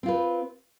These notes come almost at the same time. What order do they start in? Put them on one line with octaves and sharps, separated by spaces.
C4 F4 B4